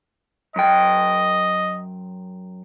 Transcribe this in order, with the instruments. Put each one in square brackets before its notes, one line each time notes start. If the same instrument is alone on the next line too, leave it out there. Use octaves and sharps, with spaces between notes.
[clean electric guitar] F#2 G5 [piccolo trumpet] D#5